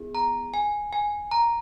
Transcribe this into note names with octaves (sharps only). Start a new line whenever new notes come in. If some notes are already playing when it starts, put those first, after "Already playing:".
Already playing: B3 E4 G#4
A#5
G#5
G#5
A#5